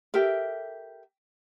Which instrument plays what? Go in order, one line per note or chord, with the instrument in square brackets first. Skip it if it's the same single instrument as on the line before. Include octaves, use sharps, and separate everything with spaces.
[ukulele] G4 A4 A#4 E5